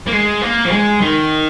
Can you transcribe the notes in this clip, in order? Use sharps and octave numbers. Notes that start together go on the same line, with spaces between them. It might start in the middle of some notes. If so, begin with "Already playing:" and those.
A#3
G#3
A#3
F3
G#3
D#3